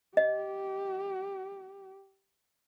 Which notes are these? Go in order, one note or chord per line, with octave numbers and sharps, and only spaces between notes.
G4 D#5